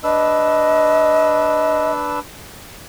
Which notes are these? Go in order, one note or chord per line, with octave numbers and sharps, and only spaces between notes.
D4 B4 D#5 E6